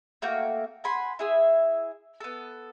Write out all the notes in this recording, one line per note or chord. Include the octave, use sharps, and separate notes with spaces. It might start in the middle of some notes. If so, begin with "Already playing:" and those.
A3 A#3 F#4 G5
F#5 G#5 B5 C6
E4 G#4 E5
B3 A4